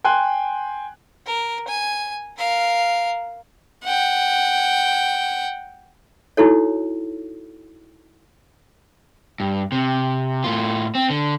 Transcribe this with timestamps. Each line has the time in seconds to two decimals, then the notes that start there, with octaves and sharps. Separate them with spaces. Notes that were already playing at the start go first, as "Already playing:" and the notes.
0.04 G5 G#5 C6 F#6
1.26 A#4
1.68 G#5
2.38 A#4 F5
3.84 F#5 G5
6.37 D#4 E4 F#4 A4 C#5
9.40 G2
9.72 C3
10.44 A2 F4
10.95 C4
11.10 D3